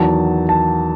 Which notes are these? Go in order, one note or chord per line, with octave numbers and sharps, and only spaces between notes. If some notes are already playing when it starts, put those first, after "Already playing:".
Already playing: E2 D#3 F#3 A5
A5